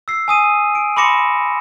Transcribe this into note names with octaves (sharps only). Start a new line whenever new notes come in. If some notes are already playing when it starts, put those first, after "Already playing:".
E6 C7
G#5 D#6 D#7
D7
B5 C6 D6 A#6 C#7 E7